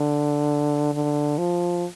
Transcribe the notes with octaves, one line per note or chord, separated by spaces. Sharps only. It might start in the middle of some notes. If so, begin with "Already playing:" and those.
Already playing: D3
D3
F3